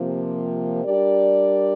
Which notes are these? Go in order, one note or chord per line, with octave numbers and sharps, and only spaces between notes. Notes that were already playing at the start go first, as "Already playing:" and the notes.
Already playing: C3 F3 A#3
G3 D4 G4 A#4 D5